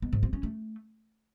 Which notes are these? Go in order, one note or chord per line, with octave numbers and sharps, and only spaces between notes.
B3
G#2
C4
C#4
A3